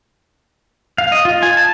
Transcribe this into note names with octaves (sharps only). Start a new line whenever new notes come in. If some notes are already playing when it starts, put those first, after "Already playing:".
F5
D#5
F4
G#5
A5